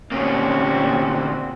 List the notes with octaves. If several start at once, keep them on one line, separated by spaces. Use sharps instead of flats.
D2 A#2 G3 A#3 C4 C#4 F#4